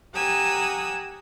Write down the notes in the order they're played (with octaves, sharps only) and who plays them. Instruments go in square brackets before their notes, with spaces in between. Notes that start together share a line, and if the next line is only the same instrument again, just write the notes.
[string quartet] G4 F#5 G#5 A#5 D#6 E6